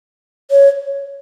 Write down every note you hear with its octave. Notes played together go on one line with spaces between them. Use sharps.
C#5